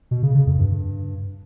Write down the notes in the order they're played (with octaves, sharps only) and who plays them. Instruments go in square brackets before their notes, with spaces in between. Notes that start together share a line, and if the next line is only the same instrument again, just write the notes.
[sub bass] B2
C#3
C#3
F2
G2